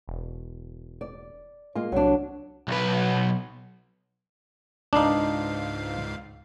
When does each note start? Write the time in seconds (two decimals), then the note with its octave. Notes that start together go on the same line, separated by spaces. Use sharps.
0.08 E1
1.01 D5
1.75 G#3 A#3 F4
1.92 C2 F#3 D4
2.68 B1 B4
4.93 C#2 G#2 D4 D#4 F5